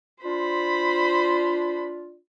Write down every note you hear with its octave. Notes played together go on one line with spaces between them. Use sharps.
D4 F4 C5 B5